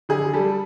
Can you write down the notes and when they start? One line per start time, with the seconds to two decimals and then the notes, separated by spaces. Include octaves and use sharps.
0.09 D3 G#4
0.33 G3 A4